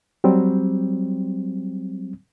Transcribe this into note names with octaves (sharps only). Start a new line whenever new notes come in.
F#3 G3 C4